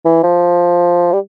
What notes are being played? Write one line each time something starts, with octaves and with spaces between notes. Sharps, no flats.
E3
F3
G3